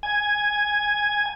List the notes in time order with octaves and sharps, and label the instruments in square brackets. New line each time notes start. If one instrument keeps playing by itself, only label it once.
[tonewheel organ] G#5